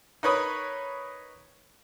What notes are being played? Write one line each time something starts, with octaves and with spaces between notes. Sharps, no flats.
D#4 A#4 B4 C#5 B5 D#6